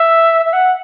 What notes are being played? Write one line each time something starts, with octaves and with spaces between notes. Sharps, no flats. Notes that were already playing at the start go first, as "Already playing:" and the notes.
Already playing: E5
E5
F#5